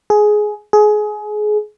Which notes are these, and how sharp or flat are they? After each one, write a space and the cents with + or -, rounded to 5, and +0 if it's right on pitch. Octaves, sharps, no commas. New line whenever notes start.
G#4 +15
G#4 +25